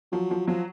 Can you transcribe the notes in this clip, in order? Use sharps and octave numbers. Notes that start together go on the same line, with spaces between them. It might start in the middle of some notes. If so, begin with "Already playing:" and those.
F3 F#3
F3
F3 F#3